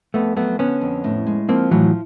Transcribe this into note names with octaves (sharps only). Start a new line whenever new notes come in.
F2 A3 B3
F#3 A3 B3
D3 B3 C#4
F2
A2
G#3
F3 A#3 C4
A2 E3 F#3